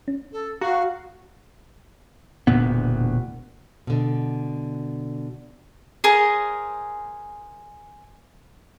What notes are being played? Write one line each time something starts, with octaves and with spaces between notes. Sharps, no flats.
C#4
A4
F#4 F5 A#5
E1 D2 A#2 B3
B2 D3
G#4 A#4 C5 D#5